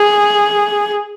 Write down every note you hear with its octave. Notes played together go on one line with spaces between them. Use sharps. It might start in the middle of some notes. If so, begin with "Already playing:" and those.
Already playing: G#4